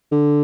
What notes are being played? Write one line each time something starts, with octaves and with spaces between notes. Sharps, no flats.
D3